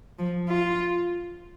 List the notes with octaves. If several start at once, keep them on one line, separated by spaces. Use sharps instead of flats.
F3
F4